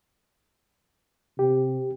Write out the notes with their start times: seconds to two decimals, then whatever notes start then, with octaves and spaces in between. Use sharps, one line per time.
1.39 C3 G4